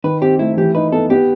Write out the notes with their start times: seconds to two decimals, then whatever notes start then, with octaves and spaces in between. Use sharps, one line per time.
0.04 D#3 B4
0.21 C4 G4
0.39 A3 E4
0.57 E3 G4
0.75 D#4 B4
0.92 B3 A4
1.10 B3 G4